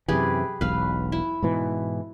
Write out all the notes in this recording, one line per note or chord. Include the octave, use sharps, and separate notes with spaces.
F#2 C3 E3 G4 G#4 B4
E1 B1 B4 F5
E4
G#2 B2 E3